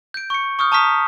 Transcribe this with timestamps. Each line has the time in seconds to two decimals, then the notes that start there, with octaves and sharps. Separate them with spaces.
0.14 G6 D7
0.30 C#6 C#7
0.59 C#6 D#6 F6 G6
0.72 A5 A#5 C#6 D#6 F6 B6